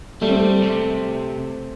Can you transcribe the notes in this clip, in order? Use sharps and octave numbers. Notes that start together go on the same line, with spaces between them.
G3 A3
C4
A3
C3